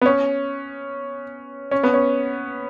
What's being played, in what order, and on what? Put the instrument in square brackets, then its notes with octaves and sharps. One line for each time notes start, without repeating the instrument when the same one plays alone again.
[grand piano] B3
C#4
C#4
B3
C#4